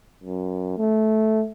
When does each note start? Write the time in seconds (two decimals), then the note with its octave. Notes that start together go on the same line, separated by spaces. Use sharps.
0.24 F#2
0.78 A3